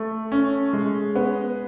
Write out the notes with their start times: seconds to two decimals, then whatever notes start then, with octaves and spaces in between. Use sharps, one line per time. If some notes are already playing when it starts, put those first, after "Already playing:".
Already playing: A3
0.32 C#4
0.73 G#3
1.16 B3